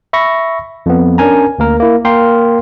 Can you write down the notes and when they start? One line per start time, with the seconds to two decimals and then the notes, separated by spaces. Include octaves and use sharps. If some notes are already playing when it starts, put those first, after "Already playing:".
0.13 E5 B5 C#6 A#6
0.86 F2 B3
1.18 C#4 D4 A#4 G#5 A#5
1.59 D2 A#3 A#4
1.80 A#3 E4
2.05 A#3 A#4 F5 G5 C6